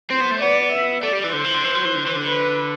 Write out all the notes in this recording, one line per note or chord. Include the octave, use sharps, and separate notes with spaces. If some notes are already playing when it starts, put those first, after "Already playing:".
C4 C5
B3
A3
B3 D5
E5
A3 D5
G3
E3
D3 C5
E3
D3
E3
F#3
E3
D3
E3
D3
B4